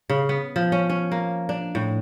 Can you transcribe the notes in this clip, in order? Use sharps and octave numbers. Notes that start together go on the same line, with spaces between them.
C#3
B3
F3
C#4
C#4
A#3
D4
A2